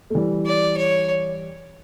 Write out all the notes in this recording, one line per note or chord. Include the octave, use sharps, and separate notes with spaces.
A3
E3 G3
D5
C#5